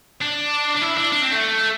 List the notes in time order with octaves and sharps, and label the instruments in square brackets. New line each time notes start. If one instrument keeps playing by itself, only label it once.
[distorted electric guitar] D4
D4
E4
D4
D4
C4
A3